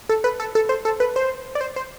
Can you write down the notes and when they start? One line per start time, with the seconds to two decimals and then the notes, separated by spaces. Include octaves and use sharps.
0.09 A4
0.24 B4
0.40 A4
0.55 A4
0.69 C5
0.85 A4
1.00 B4
1.16 C5
1.55 D5
1.61 C5
1.76 C5